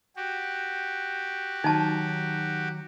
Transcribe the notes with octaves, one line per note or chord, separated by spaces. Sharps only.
F#4 G4
D#3 F#3 D#4 A5